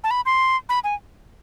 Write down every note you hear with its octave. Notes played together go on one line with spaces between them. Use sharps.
A5
B5
C6
B5
G#5